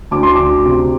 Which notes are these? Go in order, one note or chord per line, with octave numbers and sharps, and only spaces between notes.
D2 D6
C6
D2 D6
C3